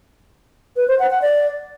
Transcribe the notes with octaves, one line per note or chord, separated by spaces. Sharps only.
B4
C5
F#5
F#5
D5